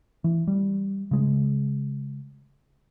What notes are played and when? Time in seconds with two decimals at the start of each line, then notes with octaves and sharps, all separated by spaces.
0.24 E3
0.47 G3
1.11 C#3 G#3